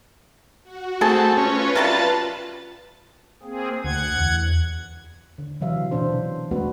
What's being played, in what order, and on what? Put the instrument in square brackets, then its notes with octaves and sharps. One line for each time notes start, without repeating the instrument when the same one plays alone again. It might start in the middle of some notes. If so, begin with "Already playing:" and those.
[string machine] F#4
[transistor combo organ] A3 [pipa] C4 G#4 A5
[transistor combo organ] C#4 [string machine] F4 B4
[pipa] C3 F#3 G3 [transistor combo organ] A5
[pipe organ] A#3 C4 G#4
[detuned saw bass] D2 [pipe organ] F#5 G#6
[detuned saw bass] E2
[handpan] D3
C3 E3 F#3 E5 F5
B2 E3 D4 C5
G#3 A3 B3 D4 F#4 B4